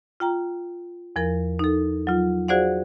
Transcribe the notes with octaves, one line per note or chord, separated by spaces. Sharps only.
F4 G5 A#5
E2 F3 A#4
D#4 A4
F#3 F4
F#4 G#4 C5 D5 F5 F#5